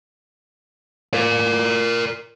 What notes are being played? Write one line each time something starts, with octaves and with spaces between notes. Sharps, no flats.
A#4 D5